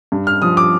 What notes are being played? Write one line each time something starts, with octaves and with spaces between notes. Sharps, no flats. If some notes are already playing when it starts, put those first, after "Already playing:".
G2
F6
F3 D#6
D6